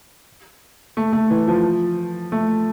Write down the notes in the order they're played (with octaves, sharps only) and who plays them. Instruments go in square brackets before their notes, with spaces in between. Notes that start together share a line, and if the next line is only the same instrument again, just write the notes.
[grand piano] A3
A3
E3
F3
A3